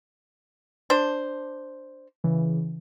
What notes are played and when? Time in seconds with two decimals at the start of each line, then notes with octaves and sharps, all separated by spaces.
0.90 D4 C5
2.24 C#3 E3